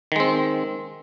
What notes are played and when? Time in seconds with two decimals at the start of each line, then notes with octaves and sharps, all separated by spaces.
0.12 D#3
0.16 G#3
0.20 C4